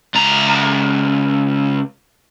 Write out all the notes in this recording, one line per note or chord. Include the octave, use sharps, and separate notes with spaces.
C#2 A#5